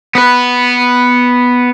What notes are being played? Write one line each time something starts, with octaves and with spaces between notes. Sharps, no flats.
B3 B4